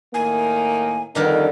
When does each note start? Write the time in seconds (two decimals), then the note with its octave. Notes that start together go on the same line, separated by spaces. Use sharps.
0.14 A2 D#3 A#3 G#5
1.15 F2 D3 D#3 G3 D#4 A#4